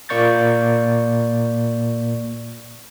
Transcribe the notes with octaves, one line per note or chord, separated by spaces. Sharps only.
A#2 A#3 D5 C#6 G6 A6